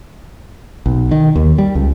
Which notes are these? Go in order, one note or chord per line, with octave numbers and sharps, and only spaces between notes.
B1
D#3
D#2
G3
C#2